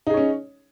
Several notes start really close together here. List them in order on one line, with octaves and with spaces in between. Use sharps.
D#4 G#4 C#5 C#4